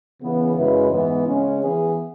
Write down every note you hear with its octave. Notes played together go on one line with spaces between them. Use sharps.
C#3 E3 B3 G#4
F#2 C#3 G#3 E4 B4
G#2 E3 B3
C#3 G#3 C#4
E3 B3 G#4 B4